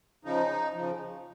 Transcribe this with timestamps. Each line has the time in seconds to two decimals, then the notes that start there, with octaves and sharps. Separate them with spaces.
0.25 C#3 F3 D#4
0.74 C#3 F3